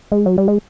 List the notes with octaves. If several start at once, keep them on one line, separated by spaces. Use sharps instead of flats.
G#3
F#3
G3
G#3